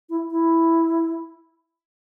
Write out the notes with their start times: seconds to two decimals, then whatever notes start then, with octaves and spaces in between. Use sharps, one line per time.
0.10 E4
0.31 E4